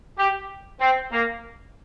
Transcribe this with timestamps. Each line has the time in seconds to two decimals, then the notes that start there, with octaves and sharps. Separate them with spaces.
0.18 G4
0.80 C4
1.12 A#3